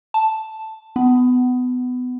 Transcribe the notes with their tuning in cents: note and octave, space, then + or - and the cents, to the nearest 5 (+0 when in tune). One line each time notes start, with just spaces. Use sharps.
A5 +0
B3 +20